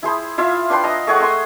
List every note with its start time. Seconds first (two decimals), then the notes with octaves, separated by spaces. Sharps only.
0.03 E4 G#4 C5 B5
0.38 E4 F4 E5 F5
0.70 D4 B4 G5 C6
0.83 D#5 A#5
1.07 A3 G#4 C#5 F#5
1.20 E5 C6 D#6